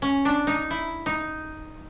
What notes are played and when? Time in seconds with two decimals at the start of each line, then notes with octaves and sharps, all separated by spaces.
0.02 C#4
0.25 D4
0.47 D#4
0.71 E4
1.06 D#4